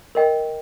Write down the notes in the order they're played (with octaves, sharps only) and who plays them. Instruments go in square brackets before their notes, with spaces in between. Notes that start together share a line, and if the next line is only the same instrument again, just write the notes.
[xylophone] A#4 D#5 G5